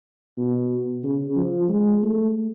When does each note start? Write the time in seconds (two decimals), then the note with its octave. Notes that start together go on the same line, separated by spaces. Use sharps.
0.37 B2
1.04 C#3
1.36 F3
1.69 G#3
2.03 A3